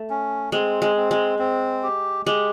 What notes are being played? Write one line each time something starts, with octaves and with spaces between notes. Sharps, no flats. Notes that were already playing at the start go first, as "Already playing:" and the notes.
Already playing: A3
C#4
G#3 C4
G#3
C4
G#3
C4
G4
G#3 G4